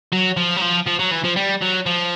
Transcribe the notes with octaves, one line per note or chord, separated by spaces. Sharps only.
F#3
F3
F#3
F3
F3
F#3
E3
F3
G3
F#3
F3